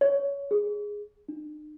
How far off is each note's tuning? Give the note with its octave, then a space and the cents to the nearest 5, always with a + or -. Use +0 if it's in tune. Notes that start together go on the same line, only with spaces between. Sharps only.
C#5 +20
G#4 -5
D#4 -40